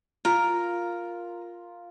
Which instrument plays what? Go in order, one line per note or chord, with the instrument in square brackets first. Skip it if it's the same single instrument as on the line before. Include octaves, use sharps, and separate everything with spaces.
[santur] F4 [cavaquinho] A#4